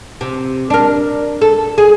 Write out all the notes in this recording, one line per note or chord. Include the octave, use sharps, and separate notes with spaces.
C3
D4 A#4
A4
G#4